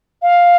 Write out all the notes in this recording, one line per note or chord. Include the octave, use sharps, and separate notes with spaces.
F5